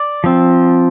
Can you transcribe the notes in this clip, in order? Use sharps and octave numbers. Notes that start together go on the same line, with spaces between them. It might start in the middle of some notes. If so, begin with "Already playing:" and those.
Already playing: D5
F3 C4